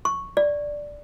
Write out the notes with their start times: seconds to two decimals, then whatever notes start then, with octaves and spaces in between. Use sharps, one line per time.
0.05 C#6
0.37 D5